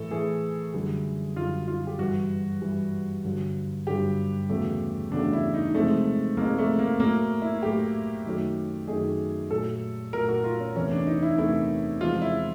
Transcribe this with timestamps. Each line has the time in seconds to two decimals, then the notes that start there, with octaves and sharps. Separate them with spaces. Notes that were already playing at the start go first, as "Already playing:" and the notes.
Already playing: A2 E3 A3 A4
0.11 A2 E3 A3 G#4
0.74 F#2 D3 G3
1.36 F#2 D3 G3 F4
1.68 F4
1.87 G4
1.99 G2 E3 G3 F#4
2.62 G2 E3 G3
3.25 G2 D3 F#3
3.87 G2 D3 F#3 G4
4.50 E2 C#3 F#3 A3
5.12 E2 C#3 F#3 A3 D4
5.33 E4
5.54 D#4
5.75 F2 C3 F3 G#3 A3
6.37 F2 C3 F3 G#3 A#3
6.58 A3
6.79 A#3
7.00 A2 F#3 A3 A#3
7.42 E4
7.63 A2 F#3 A3 G4
8.25 F#2 D#3 F#3 A3
8.88 F#2 D#3 F#3 A3 G#4
9.50 A#2 F#3 A3 A4
10.13 A#2 F#3 A3 A#4
10.29 F#4
10.44 F4
10.60 C#4
10.76 E2 C3 E3 A3 C#4
10.91 D4
11.07 D#4
11.23 E4
11.38 E2 C3 E3 A3 E4
12.01 E2 C3 F3 G#3 F4
12.22 E4